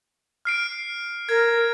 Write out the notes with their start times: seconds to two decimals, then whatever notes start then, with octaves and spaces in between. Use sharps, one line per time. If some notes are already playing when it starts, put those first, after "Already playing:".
0.45 F6 C7 D7
1.29 A#4 G#6